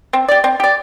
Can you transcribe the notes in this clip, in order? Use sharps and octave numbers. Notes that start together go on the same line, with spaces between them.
C4
G4 D5
C4
G4 D5